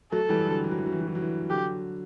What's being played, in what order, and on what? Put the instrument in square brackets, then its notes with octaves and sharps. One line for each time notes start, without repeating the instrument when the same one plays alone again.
[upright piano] F#3 A3 [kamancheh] A4
[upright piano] E3 G3
D3 F#3
E3
F#3
E3
F#3
E3
F#3
E3
F#3
E3
[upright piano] D3 F#3 [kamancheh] G4